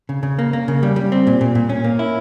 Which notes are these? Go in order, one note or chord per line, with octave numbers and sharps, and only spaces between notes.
C#3
C#3
A#3
A#3
C#3
G3
G3
C4
A#2
A#2
A#2
C#4
A#3
E4